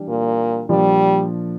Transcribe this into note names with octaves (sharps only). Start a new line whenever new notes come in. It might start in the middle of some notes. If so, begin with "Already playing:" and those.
Already playing: E3 G3 D4 G4
A#2
A#2 F3 G3 A#3 D4